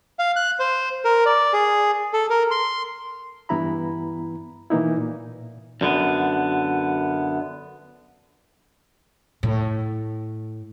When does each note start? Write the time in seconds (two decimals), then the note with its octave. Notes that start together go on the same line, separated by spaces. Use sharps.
0.19 F5
0.36 F#6
0.59 C5
1.05 A#4
1.26 D5
1.53 G#4
2.13 A4
2.30 A#4
2.51 C6
3.49 G2 E3 B3 E4 A#5 B5
4.70 B2 E3 A#3 D#4 E4
4.97 A#2
5.81 F#2 D3 B3
9.43 A2